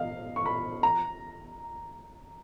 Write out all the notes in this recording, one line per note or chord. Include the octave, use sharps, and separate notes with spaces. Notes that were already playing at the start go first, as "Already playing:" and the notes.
Already playing: D#5 F5
C#6
B5
A#5